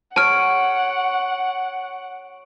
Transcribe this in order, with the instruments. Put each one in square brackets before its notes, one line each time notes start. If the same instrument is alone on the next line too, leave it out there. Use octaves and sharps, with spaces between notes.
[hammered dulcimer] C#5 [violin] F#5 [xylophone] A5 F6 [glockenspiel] D7